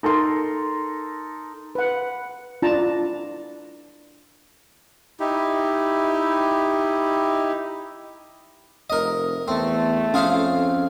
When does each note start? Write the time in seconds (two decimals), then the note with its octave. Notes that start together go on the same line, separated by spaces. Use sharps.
0.03 D#4 A4 A#4 C6
1.75 B4 F#5
2.62 D4 E4 F4 A5 A#5
5.20 D#4 E4 G4
8.90 F1 A#4 D#5
9.48 E2 A3 C4
10.14 F2 C#4 F4 G#4 F5